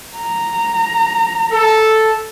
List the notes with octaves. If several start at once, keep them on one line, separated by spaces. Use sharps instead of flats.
A#5
A4